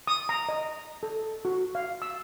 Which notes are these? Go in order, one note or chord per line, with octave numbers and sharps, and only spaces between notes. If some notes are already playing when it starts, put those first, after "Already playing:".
D#6
A#5
D#5
A4
F#4
F5
E6